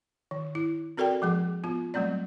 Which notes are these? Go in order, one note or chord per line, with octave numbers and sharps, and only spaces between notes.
D#3
E4
C4 F#4 A4 A#4 D5 G5
F3 G#3 G#4
B3 F4
F#3 G3 A3 C4 D5